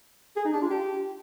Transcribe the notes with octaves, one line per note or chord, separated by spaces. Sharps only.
G#4
D#4
D4
F4
G4